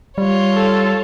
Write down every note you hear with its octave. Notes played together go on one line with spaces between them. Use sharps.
G3 F4 C#5
A4